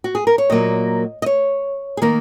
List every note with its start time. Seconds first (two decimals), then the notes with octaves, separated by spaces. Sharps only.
0.04 F#4
0.15 G#4
0.27 A#4
0.38 C#5
0.50 A#2 F#3 A#3 D#5
1.22 D#5
1.26 C#5
1.97 G#4
2.02 D#3 A#3 A#4